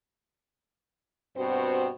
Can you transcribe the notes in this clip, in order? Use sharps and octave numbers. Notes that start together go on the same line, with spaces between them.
G2 B2 C4 F#4 C5